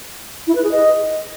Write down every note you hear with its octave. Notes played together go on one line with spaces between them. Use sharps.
E4
B4
G#4
D#5